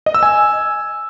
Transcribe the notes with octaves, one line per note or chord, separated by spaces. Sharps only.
D#5
E6
G#5